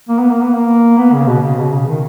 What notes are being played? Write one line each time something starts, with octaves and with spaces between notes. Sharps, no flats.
A#3
B3
A#3
B3
A#3
B3
C#3
B2
C#3
B2
C#3
D#3